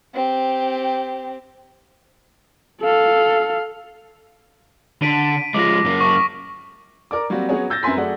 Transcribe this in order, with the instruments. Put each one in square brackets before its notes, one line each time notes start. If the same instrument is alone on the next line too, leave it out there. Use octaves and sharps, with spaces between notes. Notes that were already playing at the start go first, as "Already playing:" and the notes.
[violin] C4 G4
[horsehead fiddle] A4 F5
[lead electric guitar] D3 [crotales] B6 D7 D#7
[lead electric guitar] F3 G#3 [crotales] D6 A#6
[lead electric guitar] F#2 A#3
[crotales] C#6
[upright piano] A#4 D5 D6
F#3 G3 A#3 C4 F#4
F#3 B3 C#4 F#4 G#4 C#5
E6 G6 A6 A#6
F#2 C4 B4 G#5 C6 B6
F#3 A3 G#4 D5 F#5